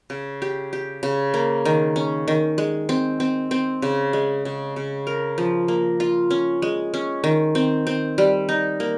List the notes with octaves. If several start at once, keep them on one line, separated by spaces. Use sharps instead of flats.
C#3
G4
G4
C#3
A#3
D#3
C#4
D#3
G#3
C4
C4
C4
C#3
G#3
C#3
C#3
A#4
F3
A#3
F4
C#4
G#3
C#4
D#3
C4
C4
G3
D#4
A#3